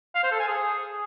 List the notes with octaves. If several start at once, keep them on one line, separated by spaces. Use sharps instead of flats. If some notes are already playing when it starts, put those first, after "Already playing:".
F5
C5
A4
G#5
G#4